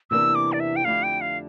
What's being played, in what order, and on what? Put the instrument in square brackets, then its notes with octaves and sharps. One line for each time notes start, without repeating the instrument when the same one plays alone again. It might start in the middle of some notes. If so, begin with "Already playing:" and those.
[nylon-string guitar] E2 C3 E3 A#3 D4 [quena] E6
[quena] D6
D5
E5
G5
[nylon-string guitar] F2 D3 A3 E4 G4 [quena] F5
[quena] G5
F5